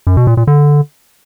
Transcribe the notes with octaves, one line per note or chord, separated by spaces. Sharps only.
F#2
B2
A#2
A#2
D3